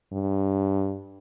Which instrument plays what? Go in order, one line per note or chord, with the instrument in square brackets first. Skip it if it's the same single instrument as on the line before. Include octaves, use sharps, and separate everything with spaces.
[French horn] G2